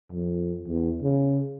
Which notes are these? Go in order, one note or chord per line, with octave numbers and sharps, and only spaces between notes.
F2
E2
C#3